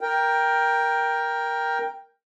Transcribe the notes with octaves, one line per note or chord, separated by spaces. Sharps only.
A#4 G5